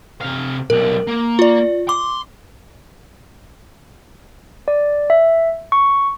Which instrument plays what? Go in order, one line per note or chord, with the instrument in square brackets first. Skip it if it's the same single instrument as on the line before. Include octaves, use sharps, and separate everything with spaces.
[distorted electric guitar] C3 F5
[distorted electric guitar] B1 G3 [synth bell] A#4
[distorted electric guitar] A#3
[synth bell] F4 D5
[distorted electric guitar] C6 [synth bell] D6
[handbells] D5
E5
C#6